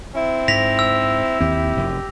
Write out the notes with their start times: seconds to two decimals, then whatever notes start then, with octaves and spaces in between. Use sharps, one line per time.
0.16 C4 E4
0.48 G#2 A#6 B6 F7
0.79 E6
1.41 D#2 C4 G4
1.77 F1 F#2